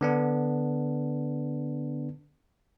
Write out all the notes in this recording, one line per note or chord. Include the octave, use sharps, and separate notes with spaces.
D3 B3 D4